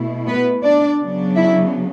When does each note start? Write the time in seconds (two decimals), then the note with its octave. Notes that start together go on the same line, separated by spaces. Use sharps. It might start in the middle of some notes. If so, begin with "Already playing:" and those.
Already playing: B2 A3 E4
0.27 B3 B4
0.63 D4 D5
0.99 C#3 F#3 B3 D4
1.35 E4 E5